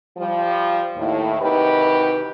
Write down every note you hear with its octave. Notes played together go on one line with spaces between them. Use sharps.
F3 G3
D#2 A2
C3 D#3 E3 F#4 G4 B4